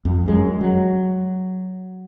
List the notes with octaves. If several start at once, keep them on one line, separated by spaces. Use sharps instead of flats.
F2
F#2 G#3
F#3